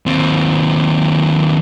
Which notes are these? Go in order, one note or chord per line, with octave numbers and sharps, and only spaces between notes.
D#2 C4